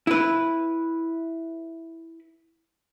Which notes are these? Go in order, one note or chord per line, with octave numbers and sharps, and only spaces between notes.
E4 B4